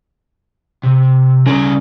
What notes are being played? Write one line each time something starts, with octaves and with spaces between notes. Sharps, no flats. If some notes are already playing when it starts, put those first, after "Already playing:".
C3
C#3 G3 A#4 D5